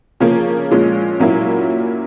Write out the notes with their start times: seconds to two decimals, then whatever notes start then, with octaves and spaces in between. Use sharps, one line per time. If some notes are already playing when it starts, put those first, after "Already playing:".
0.20 C#3 F3 A#3 C#4
0.71 A#2 F3 G#3 C#4
1.20 A#2 F#3 A#3 C#4 E4